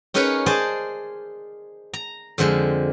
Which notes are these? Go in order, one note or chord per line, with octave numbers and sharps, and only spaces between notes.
C#4 D#4 G#4 A#4 B4 C#5
G#4 C5 D5 D#5 G#5 A5
A#5
F2 D3 F3 G#3